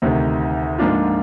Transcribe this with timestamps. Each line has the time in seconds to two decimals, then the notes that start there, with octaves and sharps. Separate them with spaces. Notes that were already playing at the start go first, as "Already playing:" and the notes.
0.02 D2 C3 D#3
0.78 G#2 F3 A#3 D4 F4